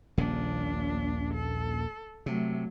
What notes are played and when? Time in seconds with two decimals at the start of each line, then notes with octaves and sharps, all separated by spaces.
0.18 D#1 A#1 A#2 C#3 D4
1.34 A4
2.26 C3 F#3 A3